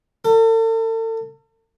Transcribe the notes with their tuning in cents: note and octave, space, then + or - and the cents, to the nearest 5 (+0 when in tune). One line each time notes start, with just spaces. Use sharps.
A4 +40